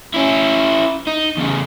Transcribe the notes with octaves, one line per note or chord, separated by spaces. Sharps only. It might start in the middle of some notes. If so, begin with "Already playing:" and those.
C#4 E4
D#4
E2 C#3